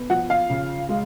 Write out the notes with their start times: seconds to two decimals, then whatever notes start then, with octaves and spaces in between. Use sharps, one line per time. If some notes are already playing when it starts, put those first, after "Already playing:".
Already playing: B3
0.10 F3 F#5
0.30 F5
0.50 C#3
0.89 G#3